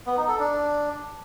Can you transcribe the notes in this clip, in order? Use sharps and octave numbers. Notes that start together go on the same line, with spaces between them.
B3
D#4
A4
D4